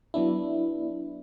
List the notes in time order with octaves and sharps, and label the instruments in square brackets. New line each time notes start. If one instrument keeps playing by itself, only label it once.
[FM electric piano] F#3 B3 D4 E4